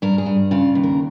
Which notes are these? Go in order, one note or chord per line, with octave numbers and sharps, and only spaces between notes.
G2 A#4
G#4
G2
C#3 F4
D#2
A#4